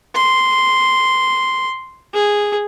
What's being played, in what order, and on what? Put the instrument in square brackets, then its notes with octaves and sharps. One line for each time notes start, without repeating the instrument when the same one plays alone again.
[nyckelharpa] C6
G#4